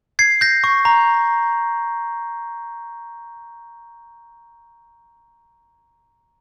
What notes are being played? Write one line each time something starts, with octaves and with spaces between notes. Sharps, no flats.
G#6 C7
G6 A#6
C#6
A#5